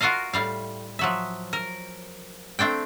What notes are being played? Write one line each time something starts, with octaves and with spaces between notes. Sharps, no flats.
F4 F#4 A#4 D#5 F5
A2 G3 F5
F3 F#3 E5
A#4
A3 C4 D4 G5